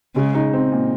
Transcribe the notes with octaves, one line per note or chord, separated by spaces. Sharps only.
C#3 G#3
D#4
C4
A#2